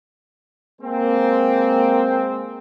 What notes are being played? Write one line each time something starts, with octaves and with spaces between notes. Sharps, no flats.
G#3 A#3 C4